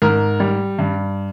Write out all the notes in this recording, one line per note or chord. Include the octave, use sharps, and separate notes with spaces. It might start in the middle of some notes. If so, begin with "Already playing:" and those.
G#2 A#4
G3
G2